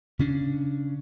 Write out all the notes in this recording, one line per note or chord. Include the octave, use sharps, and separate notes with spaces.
C#3 C#4 D4